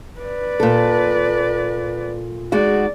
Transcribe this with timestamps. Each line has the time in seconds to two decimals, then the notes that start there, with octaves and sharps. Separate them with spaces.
0.20 B4 D5
0.60 A#2 A4
2.52 G#3 D#4 F#4 D5